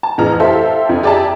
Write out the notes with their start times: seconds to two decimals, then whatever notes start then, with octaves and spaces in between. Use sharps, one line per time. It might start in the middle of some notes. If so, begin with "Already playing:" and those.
0.03 A5
0.18 A1 F2 E3 G#4 A#5 F6
0.40 E4 G4 A4 C5 E5 F5
0.89 F2
1.03 G4 G#4 D5 E5 G5 A5